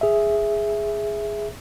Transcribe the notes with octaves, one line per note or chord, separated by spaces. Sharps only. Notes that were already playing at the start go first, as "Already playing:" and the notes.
G#4 E5